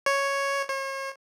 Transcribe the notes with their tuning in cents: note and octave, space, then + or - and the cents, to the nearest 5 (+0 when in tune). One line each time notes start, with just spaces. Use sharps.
C#5 +0
C#5 -40